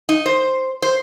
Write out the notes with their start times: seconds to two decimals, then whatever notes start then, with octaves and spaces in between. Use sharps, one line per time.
0.09 D#4
0.26 C5
0.82 C5